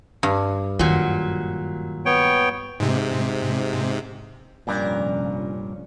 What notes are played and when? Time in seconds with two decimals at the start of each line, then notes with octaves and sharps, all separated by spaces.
0.23 G2
0.79 F#2 A#2 D#3 F#3
2.06 B3 C#5 G5
2.80 G#2 C3
4.67 F1 G2 A#2 F3 C#4 D4 A#4 D5